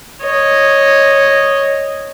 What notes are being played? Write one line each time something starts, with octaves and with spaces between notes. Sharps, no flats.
C#5 D#5